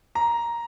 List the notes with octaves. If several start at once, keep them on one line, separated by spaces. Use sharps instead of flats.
A#5